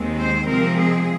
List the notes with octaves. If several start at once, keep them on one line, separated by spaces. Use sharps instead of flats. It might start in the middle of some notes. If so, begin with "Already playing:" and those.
Already playing: D#2 D#3 G#3 C4
C5
C3 F3 G#3 C4 A#4
G#4